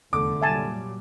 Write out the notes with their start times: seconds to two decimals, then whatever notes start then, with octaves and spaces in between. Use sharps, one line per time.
0.13 F1 E2 D3 A3 D6
0.42 A#2 F#3 G3 E5 G#5 A5